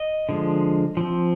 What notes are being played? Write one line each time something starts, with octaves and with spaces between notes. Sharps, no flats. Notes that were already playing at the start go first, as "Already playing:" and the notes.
Already playing: D#5
D3 F3 G#3
F3 C4